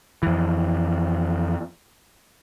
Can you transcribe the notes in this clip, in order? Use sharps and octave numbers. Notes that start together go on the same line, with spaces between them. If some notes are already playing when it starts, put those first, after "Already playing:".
F2 E3